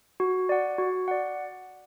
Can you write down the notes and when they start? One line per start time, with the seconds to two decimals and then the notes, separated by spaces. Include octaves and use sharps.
0.20 F#4
0.49 D5 F#5
0.78 F#4
1.08 D5 F#5